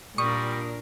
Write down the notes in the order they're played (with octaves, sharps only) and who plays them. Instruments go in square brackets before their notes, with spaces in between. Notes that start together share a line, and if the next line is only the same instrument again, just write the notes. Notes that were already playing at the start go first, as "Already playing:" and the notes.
[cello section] A#2 D4 A#4 [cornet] G3 [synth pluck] C#6 [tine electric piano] D#6